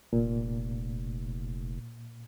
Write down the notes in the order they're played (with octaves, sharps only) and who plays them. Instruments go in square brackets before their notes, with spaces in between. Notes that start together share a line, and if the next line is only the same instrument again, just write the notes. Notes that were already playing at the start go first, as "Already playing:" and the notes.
[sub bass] F1 [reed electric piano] A#2